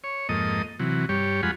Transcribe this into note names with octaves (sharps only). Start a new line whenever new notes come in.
C#5
F2 G#2 A#3 A4 D#5 D#6
C3 E3 F#3
G2 G3 G4 C#5
F2 G#3 F4 F#5 G#5 B5